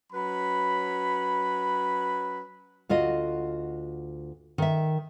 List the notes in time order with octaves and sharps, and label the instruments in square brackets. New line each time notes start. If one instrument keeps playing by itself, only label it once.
[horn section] F#3 C#4 B4 B5
[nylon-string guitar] D2 F4 F#4 D#5
D#3 E5